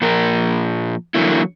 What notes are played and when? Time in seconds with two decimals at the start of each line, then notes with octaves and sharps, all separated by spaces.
0.02 A#2 F3 A#4
1.14 D3 E3 F#3 A#3 E4